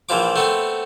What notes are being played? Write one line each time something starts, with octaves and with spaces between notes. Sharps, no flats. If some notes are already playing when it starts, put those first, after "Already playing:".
A#1 E3 F3 D6
A3 B3 C4